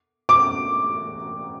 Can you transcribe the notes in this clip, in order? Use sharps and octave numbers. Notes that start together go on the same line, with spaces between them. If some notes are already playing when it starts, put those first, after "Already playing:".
D6